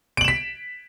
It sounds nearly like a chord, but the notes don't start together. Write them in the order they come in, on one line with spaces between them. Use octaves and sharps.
D7 F#7 E7 B6